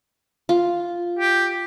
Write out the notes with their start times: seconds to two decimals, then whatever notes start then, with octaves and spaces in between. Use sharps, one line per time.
0.49 F4
1.19 G4